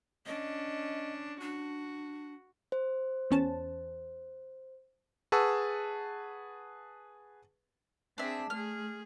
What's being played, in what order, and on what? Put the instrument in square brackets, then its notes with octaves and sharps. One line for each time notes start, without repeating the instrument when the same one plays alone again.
[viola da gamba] C#4 D4 [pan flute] D#5
[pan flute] D4 [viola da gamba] F#4
[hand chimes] C5
[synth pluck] E2 C#4 A5
[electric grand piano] G#4 B4 F#5 A5 C#6 E6
[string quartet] C4 G#4 [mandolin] D4 E5
[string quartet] A3 G#4 [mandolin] F6